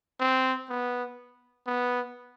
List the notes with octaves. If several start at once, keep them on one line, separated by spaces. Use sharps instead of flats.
C4
B3
B3